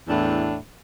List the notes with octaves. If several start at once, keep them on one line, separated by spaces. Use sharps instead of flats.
E2 A2 D4